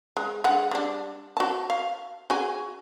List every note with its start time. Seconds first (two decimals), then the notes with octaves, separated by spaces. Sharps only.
0.17 G#3
0.44 G#3 D4 F#5
0.71 G3 D4
1.37 F#4 A5
1.70 F5
2.30 F#4 G#4 G#5